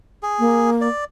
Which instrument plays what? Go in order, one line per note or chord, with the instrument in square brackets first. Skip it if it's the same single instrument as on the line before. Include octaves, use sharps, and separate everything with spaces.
[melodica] G#4
[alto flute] A#3
[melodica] D5